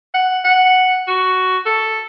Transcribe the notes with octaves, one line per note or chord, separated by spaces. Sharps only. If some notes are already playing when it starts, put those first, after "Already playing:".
F#5
F#5
F#4
A4